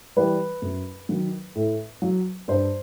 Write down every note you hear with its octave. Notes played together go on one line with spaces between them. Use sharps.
E3 G3 B4
F#2
D#3 F#3
A2
F#3
G2 C5